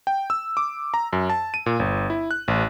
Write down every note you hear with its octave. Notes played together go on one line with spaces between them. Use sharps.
G5
E6
D6
A#5
F#2
A5
D#7
A#2
G1
E4
F#6
A1